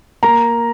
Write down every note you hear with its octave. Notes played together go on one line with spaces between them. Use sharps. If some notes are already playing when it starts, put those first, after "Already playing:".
A#3 A#5